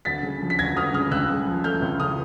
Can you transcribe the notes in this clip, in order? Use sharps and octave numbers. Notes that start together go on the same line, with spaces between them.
D2 A6 B6
C#3
F3
B6
D2 G#6 A#6
D2 D#6 F6
C#3 D#6 F6
C#2 E6 F#6
C#3
F3
A3 F6 G6
C#2
C#3 D#6 F6